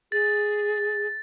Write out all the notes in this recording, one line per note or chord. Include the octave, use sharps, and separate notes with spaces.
G#4 A6